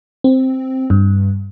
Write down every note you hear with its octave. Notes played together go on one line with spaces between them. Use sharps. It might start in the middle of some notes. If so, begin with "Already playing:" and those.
C4
G2